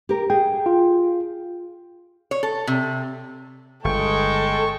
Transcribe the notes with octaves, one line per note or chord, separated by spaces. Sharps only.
G4 A#4
G#4 G5
F4
C#5
A4
C3
G1 G#3 A4 G5 C#6